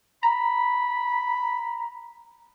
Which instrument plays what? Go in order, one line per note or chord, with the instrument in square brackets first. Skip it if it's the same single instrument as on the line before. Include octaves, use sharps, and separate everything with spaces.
[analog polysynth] A#5 [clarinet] B5